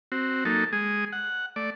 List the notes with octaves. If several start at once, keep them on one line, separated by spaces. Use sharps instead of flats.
C4 F#4
F#3 A#3 D#4 A4
G#3 G#4 D#6
F#5
A3 D5